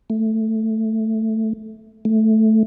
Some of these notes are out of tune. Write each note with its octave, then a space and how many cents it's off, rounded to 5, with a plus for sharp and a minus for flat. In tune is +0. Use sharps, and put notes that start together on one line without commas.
A3 +5
A3 -5